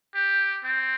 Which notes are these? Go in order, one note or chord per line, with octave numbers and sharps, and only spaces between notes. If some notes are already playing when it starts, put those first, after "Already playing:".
G4
C4